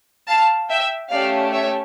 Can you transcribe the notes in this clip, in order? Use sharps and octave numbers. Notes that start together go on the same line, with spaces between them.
F5 A5
E5 G5
A3 C#4 G4 D5 F5
C#5 E5